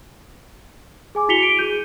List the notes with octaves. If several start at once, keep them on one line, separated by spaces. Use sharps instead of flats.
G#4 G#5 D6
E4 F#4 B6 C#7 F7 G7
D7
G#4 G6 D#7